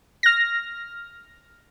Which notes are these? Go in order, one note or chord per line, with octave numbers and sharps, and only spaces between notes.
F6 A#6